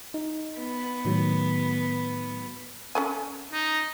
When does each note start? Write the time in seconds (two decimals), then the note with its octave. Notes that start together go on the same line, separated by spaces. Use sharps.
0.14 D#4
0.58 B3
1.05 A2 D#3 F#3
2.95 C#4 A4 G#5
3.53 D#4